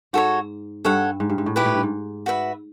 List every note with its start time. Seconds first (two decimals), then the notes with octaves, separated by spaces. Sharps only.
0.13 G#2 F#4 A4 C#5
0.85 G2 A4 C#5 F#5
1.20 G#2
1.30 G2
1.38 G#2
1.46 A2
1.56 A#2 E4 G4 B4
1.65 A2
1.74 G2
1.83 G#2
2.26 F#4 B4 E5